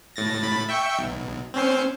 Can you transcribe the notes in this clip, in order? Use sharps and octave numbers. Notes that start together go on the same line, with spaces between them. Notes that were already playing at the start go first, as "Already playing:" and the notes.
A2 A6 A#6
A2 B5 A6
E5 G5 C#6
B1
C4 C#4 C5